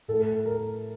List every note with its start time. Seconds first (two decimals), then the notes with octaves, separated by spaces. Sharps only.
0.08 A2 A3 A4
0.45 A#4